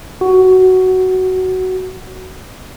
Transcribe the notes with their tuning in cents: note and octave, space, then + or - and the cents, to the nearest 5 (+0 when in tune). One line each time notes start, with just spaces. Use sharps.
F#4 +10